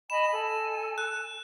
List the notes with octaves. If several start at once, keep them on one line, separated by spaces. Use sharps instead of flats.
D#5 G#5 B5 E7
A4 G#5
F#6